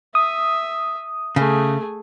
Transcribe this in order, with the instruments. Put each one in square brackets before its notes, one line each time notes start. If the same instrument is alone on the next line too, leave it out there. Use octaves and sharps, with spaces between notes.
[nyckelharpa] E5 [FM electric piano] D#6
[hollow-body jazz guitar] C#3 [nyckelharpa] A3 G#4